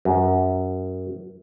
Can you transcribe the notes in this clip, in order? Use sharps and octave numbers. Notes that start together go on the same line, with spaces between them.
F#2